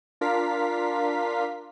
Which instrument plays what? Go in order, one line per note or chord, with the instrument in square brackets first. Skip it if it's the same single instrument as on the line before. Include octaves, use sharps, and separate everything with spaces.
[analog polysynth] D4 F4 A#4 F5 B6